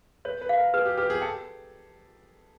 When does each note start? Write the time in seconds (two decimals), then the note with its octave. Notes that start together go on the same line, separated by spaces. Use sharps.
0.25 B4 C#5
0.41 B4
0.49 F5
0.57 A#4
0.74 G#4 B4
0.85 G4
0.97 G4 B4
1.10 G#4
1.22 A4 G5